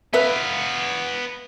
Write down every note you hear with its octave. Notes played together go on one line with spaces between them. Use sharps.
B3 B4 E5 F5